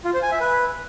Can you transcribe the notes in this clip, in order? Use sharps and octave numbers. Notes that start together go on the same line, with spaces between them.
F4
C5
G#5
E5
B4